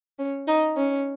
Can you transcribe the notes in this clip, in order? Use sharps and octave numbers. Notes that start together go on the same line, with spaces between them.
C#4
D#4
C#4